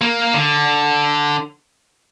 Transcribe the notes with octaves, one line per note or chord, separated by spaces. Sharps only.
A#3
D3